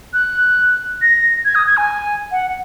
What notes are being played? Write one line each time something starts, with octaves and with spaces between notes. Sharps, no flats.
F#6
A#6
G#6
D#6
G#6
G#5
F#5